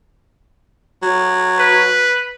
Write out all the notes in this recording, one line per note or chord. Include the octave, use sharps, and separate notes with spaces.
F#3
B4